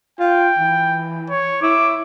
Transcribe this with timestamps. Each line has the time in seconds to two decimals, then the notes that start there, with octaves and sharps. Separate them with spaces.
0.19 F4 G5
0.59 E3
1.30 C#5
1.62 E4 D6